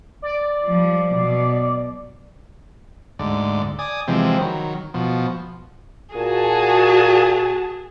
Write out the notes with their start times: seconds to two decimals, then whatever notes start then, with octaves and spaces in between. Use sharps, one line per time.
0.22 D5
0.66 F3 G3
1.12 B2 F#3
3.19 D2 G#2 D5
3.79 D5 G#5 D#6
4.08 C3 E3 F3 G#3 C4
4.40 D#3 F#3
4.94 B2 F3
6.15 A#2 F#4 G#4 G#5 A5